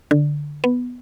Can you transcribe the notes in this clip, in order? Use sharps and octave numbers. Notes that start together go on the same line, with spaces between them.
D3
B3